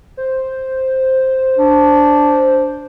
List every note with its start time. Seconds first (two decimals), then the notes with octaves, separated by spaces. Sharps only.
0.17 C5
1.57 D4